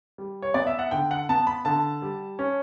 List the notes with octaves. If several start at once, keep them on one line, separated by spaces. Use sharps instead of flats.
G3
C#5
B3 D5
E5
F#5
D3 G5
F#5
B3 A5
B5
D3 A5
G3
C#4